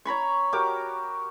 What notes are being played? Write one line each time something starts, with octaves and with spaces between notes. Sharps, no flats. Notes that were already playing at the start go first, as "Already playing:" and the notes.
C#5 A#5 B5 C#6
F#4 G4 A#4 D6